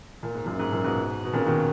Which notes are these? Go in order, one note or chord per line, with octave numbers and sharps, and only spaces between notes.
A#2
G#2
F#2 A#2
G#2
F#2 A#2
G#2 B2
B2
A#2 C#3
B2 D#3